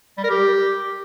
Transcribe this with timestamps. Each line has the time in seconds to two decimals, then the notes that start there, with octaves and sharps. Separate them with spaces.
0.18 G3
0.24 A#4
0.30 G4